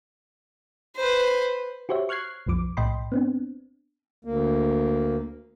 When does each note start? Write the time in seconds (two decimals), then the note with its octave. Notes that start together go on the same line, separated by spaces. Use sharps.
0.96 B4 C5
1.89 F#4 G4 C5 C#5 E5
2.09 C#6 F6 F#6 G#6 C7
2.46 B1 F2 F3 D6
2.77 B1 A2 D#5 G5 B5 C6
3.12 B3 C4 D4
4.25 D2 A#3